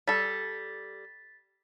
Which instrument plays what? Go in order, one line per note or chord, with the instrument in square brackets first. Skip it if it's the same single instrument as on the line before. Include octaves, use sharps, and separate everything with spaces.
[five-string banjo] G3 A4 [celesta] A6 B6